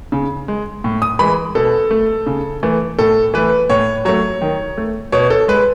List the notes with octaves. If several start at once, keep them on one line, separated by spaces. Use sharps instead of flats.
C#3
G#3
A2
D#6
E3 G#3 B5
B2 A4
A3
C#3
E3 A3
A2 A4
E3 A3 B4
A2 C#5
F#3 A3 C#5
D#3
A3
B2 C#5
A4
G#3 B4